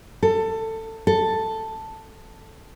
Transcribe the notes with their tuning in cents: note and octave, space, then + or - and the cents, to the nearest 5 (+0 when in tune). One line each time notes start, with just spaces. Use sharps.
A4 +20
A4 +5